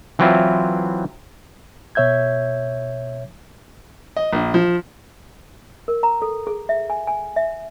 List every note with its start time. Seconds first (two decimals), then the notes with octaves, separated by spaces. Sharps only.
0.19 E3 F#3 C4 E4 F4
1.95 B2 C#5 E5 G6 G#6
4.17 D#5
4.33 A#1
4.54 F3
5.88 A#4
6.03 A#5
6.22 A4
6.47 G#4
6.69 E5
6.90 G#5
7.07 G#5
7.36 E5